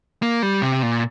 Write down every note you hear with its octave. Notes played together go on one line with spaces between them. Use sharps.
A#3
G3
C3
A#2